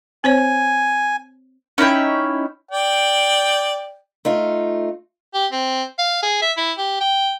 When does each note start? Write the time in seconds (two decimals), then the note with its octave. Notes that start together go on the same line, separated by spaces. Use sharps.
0.24 C4 C5 C#5 G#5
1.78 C#4 D#4 E4 G5
2.71 D5 G5
4.25 A3 D#4 F4
5.34 G4
5.51 C4
5.99 F5
6.23 G#4
6.42 E5
6.57 E4
6.78 G4
7.00 G5